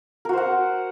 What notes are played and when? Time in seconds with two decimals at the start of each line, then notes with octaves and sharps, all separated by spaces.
0.25 A#4
0.29 F#4
0.33 C5
0.37 F#5